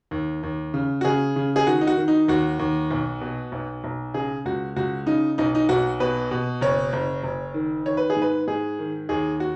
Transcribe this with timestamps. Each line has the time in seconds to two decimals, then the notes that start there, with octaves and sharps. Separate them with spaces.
0.11 D#2
0.43 D#2
0.74 C#3
1.01 F#4
1.04 C#3 G#4
1.36 C#3
1.56 G#4
1.66 D#3 F#4
1.81 D#4
1.87 F#4
1.97 D#3
2.08 D#4
2.28 D#2 F#4
2.59 D#2
2.91 B1
3.21 B2
3.52 B1
3.84 B1
4.14 C#3 G#4
4.45 C#2 F#4
4.76 C#2 F#4
5.07 C#3 D#4
5.38 B1 D#4
5.55 D#4
5.69 B1 F#4
6.00 B2 B4
6.31 B2
6.61 F#1 C#5
6.93 F#1
7.23 F#1
7.54 D#3
7.86 D#3 C#5
7.97 B4
8.10 G#4
8.16 G#2
8.22 B4
8.47 G#2 G#4
8.79 D#3
9.09 D#2 G#4
9.40 F#4